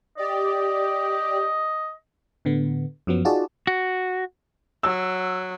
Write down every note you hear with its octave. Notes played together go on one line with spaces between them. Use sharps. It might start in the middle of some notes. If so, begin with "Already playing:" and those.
G4 D5 D#5
A2 D3 B3
F#2 F3 F#3 B3
D#4 F4 F#4 G#4 D5 A5
F#4
F#3 E6